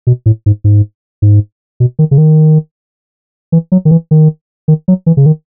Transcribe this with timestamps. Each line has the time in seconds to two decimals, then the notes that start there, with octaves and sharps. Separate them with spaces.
0.07 B2
0.26 A2
0.46 G#2
0.64 G#2
1.22 G#2
1.80 B2
1.99 D#3
2.11 C#3
2.18 D#3
3.52 E3
3.72 F#3
3.85 D#3
3.91 E3
4.11 D#3
4.68 D#3
4.88 F#3
5.06 E3
5.17 C#3
5.26 D#3